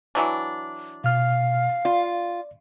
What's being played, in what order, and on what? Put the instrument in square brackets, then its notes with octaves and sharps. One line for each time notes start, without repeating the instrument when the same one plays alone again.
[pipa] E3 F#3 D4
[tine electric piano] B2 F6 [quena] F5
[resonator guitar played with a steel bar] F4 [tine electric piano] D5